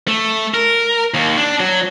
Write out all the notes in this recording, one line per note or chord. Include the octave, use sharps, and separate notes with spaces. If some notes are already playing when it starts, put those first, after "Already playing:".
A3
A#4
D#2
D4
F#3